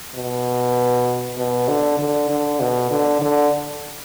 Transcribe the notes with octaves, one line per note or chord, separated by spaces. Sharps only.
B2
B2
D3
D3
D3
B2
D3
D3